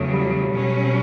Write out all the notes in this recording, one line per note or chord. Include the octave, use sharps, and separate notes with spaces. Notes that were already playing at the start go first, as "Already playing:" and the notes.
Already playing: E2 C#3 F#3 A3
G3
B2 F#3 C#4